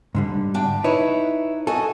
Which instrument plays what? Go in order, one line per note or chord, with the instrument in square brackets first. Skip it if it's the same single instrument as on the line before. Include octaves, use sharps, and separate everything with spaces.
[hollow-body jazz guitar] G#2 D3 G3
[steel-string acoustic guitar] E2 D4 G5
[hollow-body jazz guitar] D#4 [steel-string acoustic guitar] E4 B4 C#5
[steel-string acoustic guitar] F#4 D#5 G#5 [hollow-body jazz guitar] A4